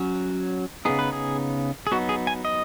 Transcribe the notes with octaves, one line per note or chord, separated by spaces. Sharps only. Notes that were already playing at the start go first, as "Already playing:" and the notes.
Already playing: F#3 C#4
C#3 B3 D#4 G#4
B4
G#4
G#4
F#3 B3 D#4 F#4
G#4
G#5
D#5